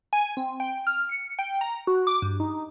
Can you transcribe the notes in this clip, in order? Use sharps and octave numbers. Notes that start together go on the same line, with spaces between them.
G#5
C4
G5
F6
C#7
G5
A#5
F#4
D6
G2
D#4